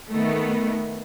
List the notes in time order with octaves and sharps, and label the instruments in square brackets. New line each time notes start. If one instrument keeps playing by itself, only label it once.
[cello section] D#3 A3 B3